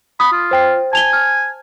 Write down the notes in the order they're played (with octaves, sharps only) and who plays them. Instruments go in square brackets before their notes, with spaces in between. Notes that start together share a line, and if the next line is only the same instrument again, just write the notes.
[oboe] B5 [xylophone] D#6
[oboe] F4
[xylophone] C5 G5 C7
[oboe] G#5 [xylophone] A5 F7 G7
[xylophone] F6